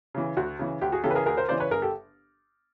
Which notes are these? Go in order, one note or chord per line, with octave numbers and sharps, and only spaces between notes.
C#3 E3
D2 F#4
C#3 E3
D2 G4
F#4 G#4
C#3 E3 G4 A4
B4
G#4 A#4
D2 G#4 A#4
A#4 C5
C#3 E3 C5 D5
B4 C#5
G1 G#4 A#4
G4 A4